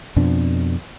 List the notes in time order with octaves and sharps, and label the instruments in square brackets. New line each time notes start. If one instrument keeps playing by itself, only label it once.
[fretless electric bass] F2 B2 C4 D4